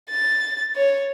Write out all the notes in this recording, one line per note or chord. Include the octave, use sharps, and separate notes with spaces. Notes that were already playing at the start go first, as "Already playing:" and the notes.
A6
C#5